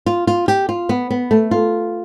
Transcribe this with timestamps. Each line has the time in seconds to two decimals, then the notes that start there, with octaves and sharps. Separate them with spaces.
0.06 F4
0.27 F4
0.48 G4
0.69 F4
0.89 B3
1.11 B3
1.31 A3
1.51 F4